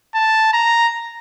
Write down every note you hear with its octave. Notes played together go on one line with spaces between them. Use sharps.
A5
A#5